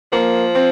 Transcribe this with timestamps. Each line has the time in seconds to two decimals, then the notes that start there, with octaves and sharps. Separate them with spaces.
0.13 F3 A#3
0.55 C4